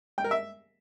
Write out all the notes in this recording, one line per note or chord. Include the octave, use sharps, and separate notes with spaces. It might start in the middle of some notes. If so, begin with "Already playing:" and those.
G5
A#4
E5